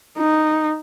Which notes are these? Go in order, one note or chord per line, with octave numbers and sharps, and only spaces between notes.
D#4